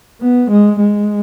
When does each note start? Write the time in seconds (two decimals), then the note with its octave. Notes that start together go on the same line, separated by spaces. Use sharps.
0.21 B3
0.50 G#3
0.80 G#3